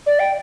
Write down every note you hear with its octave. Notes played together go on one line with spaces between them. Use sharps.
D5
G5